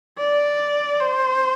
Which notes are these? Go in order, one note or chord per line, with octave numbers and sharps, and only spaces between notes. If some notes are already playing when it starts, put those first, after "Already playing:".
D5
C5